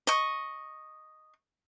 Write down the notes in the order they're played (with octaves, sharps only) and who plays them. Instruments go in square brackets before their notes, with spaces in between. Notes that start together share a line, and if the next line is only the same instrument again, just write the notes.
[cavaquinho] D#5 C#6